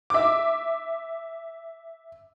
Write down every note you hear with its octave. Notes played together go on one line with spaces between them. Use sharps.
E5 D6